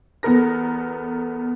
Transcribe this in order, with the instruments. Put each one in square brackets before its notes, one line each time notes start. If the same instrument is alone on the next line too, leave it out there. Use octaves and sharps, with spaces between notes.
[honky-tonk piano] E2 B3 A4 A#4 A#6